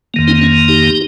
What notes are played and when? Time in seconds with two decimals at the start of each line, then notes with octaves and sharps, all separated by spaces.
0.14 F2 D#3 A#3
0.27 C4 D#4
0.41 C#4
0.68 D#4 G4